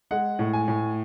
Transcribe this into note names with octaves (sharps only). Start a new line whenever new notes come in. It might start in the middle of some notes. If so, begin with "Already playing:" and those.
G#3 F#5
A2
G#5
A2